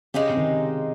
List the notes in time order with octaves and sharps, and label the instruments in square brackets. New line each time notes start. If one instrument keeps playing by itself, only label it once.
[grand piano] C#3 [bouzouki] G#3 C4 D#4 G4
[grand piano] C3
D#3